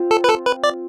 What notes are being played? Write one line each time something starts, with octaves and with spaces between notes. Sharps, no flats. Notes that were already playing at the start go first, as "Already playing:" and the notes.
Already playing: C4 F4
A4
B4
A4
B4
D5